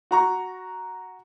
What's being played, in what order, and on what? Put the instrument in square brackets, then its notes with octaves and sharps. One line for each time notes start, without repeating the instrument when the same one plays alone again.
[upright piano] F#4 A#5 C#6